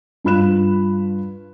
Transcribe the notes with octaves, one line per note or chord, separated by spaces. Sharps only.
G2 F4 B5 F#6 E7